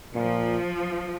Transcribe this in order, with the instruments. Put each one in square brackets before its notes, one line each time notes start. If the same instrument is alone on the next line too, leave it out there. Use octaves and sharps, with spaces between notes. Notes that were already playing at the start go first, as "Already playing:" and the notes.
[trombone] A#2 [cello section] F3